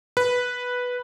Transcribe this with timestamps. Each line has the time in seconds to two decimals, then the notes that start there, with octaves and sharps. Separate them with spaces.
0.17 B4